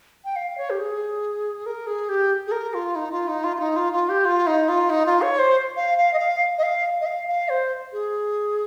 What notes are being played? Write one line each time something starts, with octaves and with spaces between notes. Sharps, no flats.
G5
F5
C#5
G4
G#4
A#4
G#4
G4
G#4
A#4
F4
D#4
F4
D#4
F4
F4
D#4
F4
F4
G4
F4
D#4
F4
D#4
F4
C#5
C5
F5
F5
D#5
F5
D#5
F5
D#5
F5
F5
C5
G#4